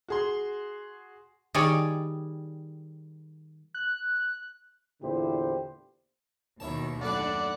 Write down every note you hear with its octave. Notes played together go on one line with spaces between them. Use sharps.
F#4 G#4 C6
D#3 G3 G#4 C#5 D5
F#6
E2 A#2 D3 E4 G4 C5
D#2 B2 D#3 E4 C#5 A5
F#2 A2 D4 B4 D5 F#5